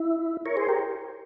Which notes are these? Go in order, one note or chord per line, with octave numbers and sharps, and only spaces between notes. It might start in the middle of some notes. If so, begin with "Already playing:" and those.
Already playing: E4
A#4 C#5
G#4 C5
G4 A#4